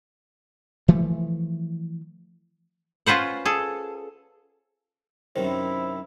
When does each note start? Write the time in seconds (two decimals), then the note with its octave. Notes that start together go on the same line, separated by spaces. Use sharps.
0.88 E3 F3 A3
3.06 C#4 F4 B4 C5 F#5
3.45 G#4 A4
5.36 F#2 C3 D#3 E4 C5